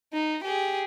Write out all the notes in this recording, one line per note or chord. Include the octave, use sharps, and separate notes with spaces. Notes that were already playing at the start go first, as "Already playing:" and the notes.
D#4
G4 G#4